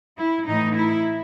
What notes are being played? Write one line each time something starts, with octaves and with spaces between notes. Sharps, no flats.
E4
A2 E3 A3 D#4
E4